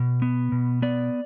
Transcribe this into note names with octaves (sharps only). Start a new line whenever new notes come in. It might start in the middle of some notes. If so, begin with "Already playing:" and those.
Already playing: B2
B3
B2
B3 D5